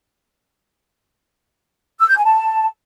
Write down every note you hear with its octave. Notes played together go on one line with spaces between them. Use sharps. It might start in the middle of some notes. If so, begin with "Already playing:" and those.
E6
G6
G#5
A5